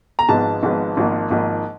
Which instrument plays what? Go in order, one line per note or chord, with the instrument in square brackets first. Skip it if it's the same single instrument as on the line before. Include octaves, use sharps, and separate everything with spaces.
[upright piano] A#5
G#1 G#2 F3 G#3 B3 A5
G#1 G#2 F3 G#3 B3
G#1 G#2 F3 A#3
G#1 G#2 F3 A#3